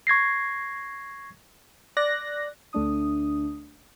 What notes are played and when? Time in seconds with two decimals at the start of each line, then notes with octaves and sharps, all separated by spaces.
0.07 C#6 G#6 A#6 C7
1.97 D5 F#6 A#6
2.73 D2 A3 D4 D#6